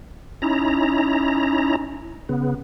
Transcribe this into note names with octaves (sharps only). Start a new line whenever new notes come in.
C#4 D#4 E4 A#5
C#3 B3